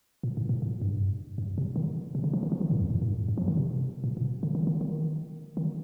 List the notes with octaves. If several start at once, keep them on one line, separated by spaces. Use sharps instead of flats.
A#2
A2
A#2
A2
G2
G2
C3
D#3
C3
D3
F3
D#3
F3
D#3
A2
F2
A2
A2
G2
G2
F3
D#3
C3
A#2
A#2
D3
D#3
D#3
D#3
D#3